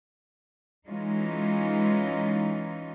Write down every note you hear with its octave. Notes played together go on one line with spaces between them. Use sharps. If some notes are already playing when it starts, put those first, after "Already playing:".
E3 G#3 C#4 D#4 F4